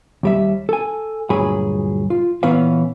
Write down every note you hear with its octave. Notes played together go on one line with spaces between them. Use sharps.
D#2 G3 E5
A4 G#5
D2 G2 A#2 F#3 G#4 B5
F4
A#2 E3 B3 C#4 F5